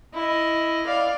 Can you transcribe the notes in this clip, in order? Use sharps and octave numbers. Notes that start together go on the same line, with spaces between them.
E4 D#5
D5 F5